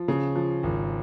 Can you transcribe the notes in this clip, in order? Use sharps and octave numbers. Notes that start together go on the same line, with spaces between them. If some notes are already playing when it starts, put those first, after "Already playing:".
Already playing: F3
C#3
F3
G#1